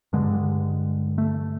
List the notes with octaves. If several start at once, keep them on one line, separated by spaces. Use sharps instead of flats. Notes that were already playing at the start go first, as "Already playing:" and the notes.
G2 D3 G#3
A3